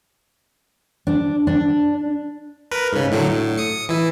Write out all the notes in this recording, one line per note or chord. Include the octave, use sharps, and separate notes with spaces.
D4
D4
A#4 B4
G#2 C#3
A2 D3 F#3
A2
D#6 C#7
E3 E4